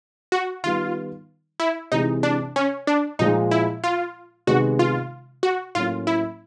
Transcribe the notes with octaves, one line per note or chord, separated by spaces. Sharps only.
F#4
D#3 G3 B3 F4
E4
C3 E3 G#3 D#4
D4
C#4
D4
A#2 F3 G#3 D#4
E4
F4
C3 D#3 G#3 B3 F#4
F4
F#4
A2 F#3 A#3 C#4 F4
E4